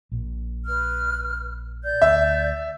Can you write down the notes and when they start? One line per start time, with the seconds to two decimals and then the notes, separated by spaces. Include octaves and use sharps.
0.12 A#1 A#2
0.66 B4 F6
1.83 D5 G6
2.02 D2 E5